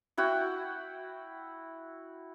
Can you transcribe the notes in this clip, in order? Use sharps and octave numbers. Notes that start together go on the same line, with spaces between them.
E4 F#4 F#5 G5